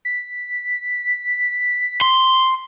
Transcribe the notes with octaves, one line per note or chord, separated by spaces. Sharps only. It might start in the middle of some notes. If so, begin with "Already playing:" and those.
B6
C6